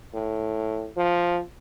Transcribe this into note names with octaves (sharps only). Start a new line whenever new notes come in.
A2
F3